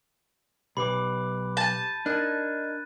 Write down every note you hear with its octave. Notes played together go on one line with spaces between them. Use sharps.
B1 G4 B4 B5 D6
A5 G6 A6 D#7
D4 D#4 A#4 F#6 G#6